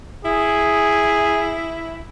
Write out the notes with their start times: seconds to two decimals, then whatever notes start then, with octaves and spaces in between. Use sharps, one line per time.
0.25 E4 G#4